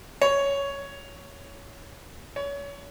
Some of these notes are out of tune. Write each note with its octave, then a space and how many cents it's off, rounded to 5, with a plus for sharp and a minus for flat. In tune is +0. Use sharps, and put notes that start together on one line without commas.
C#5 +10
C#5 +30